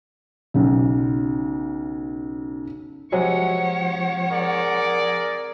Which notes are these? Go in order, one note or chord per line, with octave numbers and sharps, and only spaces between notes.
B1 C#3
C3 F3 F#3 G#3 C#5 F#5
G#4 A#4 D5